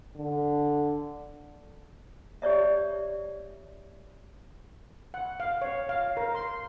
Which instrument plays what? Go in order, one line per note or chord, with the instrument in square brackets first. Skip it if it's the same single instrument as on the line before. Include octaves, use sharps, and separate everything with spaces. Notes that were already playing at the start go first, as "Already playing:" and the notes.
[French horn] D3
[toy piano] G4 C#5 D5 E5
[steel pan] F#5
F5
C#5
F5
A#4
C6